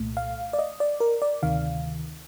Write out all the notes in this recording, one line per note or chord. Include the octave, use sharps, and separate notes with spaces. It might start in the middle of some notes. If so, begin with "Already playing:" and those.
Already playing: C2 A#2 A3
F5
D5
D#5
D5
A#4
D5
D2 C3 D#3 F5